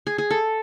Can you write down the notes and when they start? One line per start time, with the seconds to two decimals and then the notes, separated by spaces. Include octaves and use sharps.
0.07 G#4
0.18 G#4
0.31 A4